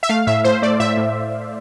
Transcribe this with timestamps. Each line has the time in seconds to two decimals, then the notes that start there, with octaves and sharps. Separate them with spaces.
0.03 E5
0.09 A3 F5
0.27 A2 E5
0.44 A2 C5
0.62 A3 D5
0.80 A2 E5
0.97 A2